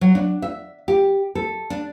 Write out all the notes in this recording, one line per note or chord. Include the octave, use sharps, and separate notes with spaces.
F#3
D4
E5
G4
A4
D4